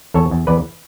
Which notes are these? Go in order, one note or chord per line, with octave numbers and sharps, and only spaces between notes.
E2 A4 C#5
E2
E2 B4 D5